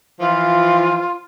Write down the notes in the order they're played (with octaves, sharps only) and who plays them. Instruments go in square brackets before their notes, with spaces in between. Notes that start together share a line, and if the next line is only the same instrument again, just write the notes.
[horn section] E3 F3 [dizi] F4